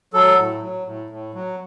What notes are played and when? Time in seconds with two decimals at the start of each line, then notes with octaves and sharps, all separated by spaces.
0.13 F#3 A4
0.38 A2
0.62 F#3
0.86 A2
1.10 A2
1.34 F#3